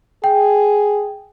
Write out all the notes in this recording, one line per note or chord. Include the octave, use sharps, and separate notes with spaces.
G#4 G5